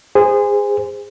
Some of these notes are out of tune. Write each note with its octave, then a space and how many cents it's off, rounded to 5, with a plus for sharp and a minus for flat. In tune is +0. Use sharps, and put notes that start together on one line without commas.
G#4 -20 C5 -20